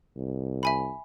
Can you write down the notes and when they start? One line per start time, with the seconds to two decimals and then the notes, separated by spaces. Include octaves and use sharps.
0.16 C2
0.63 E5 G#5 B5